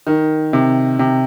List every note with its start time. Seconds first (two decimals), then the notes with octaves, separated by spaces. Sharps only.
0.07 D#3
0.53 C3
0.99 C3